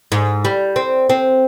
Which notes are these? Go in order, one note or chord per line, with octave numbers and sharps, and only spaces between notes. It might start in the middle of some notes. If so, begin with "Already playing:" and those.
G#2
G3
C4
C4